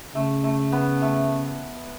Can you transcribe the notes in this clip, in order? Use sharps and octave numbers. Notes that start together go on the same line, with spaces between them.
C#3 A3
A3
B3
A3